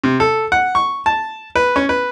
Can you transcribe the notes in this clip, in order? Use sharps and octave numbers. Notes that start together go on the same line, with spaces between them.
C3
A4
F#5
C#6
A5
B4
C#4
B4